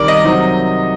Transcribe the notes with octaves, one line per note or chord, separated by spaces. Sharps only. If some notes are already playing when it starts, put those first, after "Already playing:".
Already playing: C2 D#3 G3 A#4 D5
D#5
C3 F#3 C4 D#4